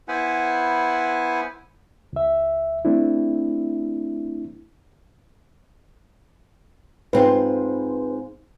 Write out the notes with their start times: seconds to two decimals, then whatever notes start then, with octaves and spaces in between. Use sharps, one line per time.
0.08 B3 E4 B4 C5 F#5 G#5
2.13 C#2 E5
2.85 A3 C4 D4 E4
7.13 G#2 C4 F4 B4 C5